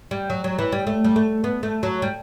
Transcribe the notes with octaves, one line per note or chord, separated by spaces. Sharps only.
G3
F#3
F#3
E3
G3
A3
G3
A3
B3
A3
F#3
G3